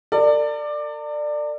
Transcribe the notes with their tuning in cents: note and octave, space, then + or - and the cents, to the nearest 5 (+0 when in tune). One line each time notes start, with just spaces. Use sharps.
A#4 -45 D5 +15